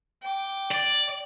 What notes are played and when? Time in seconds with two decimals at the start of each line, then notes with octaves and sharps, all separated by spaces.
0.21 G5 D6
0.72 D5